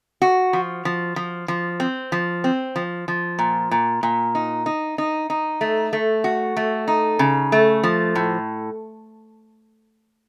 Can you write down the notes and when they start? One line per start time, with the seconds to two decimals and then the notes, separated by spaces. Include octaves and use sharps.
0.22 F#4
0.53 F3
0.85 F3
1.16 F3
1.48 F3
1.80 C4
2.12 F3
2.44 C4
2.76 F3
3.08 F3
3.39 A#2
3.71 A#2
4.03 A#2
4.35 D#4
4.66 D#4
4.98 D#4
5.30 D#4
5.61 A3
5.93 A3
6.24 F#4
6.57 A3
6.88 D#4
7.19 C#3
7.52 A3
7.83 F3
8.16 A2